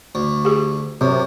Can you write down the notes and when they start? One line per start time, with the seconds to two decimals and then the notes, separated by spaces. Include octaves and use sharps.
0.15 D2
0.45 G4 G#4
1.01 F#2 C3